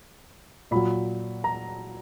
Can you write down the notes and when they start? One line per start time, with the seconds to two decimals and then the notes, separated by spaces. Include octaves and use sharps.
0.71 A#2 F#3 B5
1.44 A#5